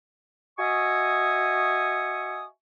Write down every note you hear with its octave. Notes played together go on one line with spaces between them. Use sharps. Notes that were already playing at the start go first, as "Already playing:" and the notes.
F#4 D#5 E5 G#5 C#6 D#6